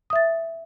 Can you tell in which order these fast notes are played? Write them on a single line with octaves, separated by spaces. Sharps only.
D#6 E5 A6